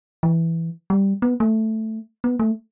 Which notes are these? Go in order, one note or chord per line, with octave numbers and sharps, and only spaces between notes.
E3
G3
B3
A3
B3
A3